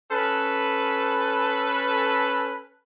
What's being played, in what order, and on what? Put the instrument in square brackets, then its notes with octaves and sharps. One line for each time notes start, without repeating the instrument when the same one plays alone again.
[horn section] C#4 A4 B4